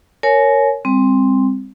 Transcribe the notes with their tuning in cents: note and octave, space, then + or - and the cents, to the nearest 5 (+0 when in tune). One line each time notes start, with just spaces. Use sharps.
A#4 -10 C#5 +0 G#5 +30
G3 +40 C4 +0